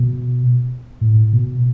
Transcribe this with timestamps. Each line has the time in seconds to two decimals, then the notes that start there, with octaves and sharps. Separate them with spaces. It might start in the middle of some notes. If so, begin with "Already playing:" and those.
Already playing: B2
1.01 A2
1.33 B2